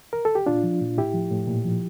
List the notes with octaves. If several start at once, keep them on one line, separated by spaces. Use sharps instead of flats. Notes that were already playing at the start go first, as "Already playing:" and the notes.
A#4
A4
G4
A#2 D4 F4
F3
A#2
A2 E4 G4
F3
A2
A#2
F3